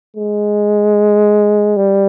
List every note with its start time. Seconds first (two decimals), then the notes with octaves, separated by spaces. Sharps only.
0.16 G#3
1.77 G3